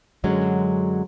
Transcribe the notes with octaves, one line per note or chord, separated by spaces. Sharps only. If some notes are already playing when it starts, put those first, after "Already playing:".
F#2 D3 F#3 G#3 C#4